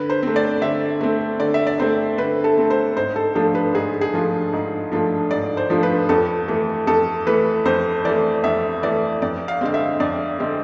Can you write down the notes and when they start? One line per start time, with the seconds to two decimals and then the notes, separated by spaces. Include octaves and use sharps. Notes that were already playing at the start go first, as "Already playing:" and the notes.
Already playing: D3 B4
0.10 C5
0.23 A3 C4
0.36 D5
0.62 D3 E5
1.01 A3 C4
1.40 D3 D5
1.54 E5
1.67 D5
1.80 A3 C4 C5
2.18 D3 B4
2.44 A4
2.57 A3 C4
2.70 C5
2.96 G#2 C5
3.16 A4
3.35 F3 A3 D4 F4 A4
3.55 B4
3.75 G#2 G#4
4.01 G#4
4.14 F3 A3 D4 F4
4.53 G#2
4.92 F3 A3 D4 F4
5.31 G#2 D5
5.57 C5
5.70 F3 A3 D4 F4
5.83 B4
6.09 F2 A4
6.48 E3 A3
6.87 F2 A4
7.27 E3 A3 B4
7.65 F2 C5
8.05 E3 A3 D5
8.43 F2 E5
8.83 E3 A3 D5
9.22 F2 D5
9.48 F5
9.61 D3 G#3 C4 F5
9.74 E5
10.00 F2 D5
10.39 D3 G#3 C4